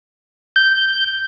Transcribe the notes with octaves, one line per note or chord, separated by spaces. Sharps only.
G6